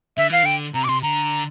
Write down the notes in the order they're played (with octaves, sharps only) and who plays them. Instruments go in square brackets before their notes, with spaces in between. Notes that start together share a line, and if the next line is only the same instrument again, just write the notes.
[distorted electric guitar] D3 [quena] E5
[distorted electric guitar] E3 [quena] F5
[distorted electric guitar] D3 [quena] G5
[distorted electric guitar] C3 [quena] A#5
[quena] D6
[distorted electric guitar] C3 [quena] C6
[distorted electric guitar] D3 [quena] A#5